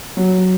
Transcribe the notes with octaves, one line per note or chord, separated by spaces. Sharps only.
F#3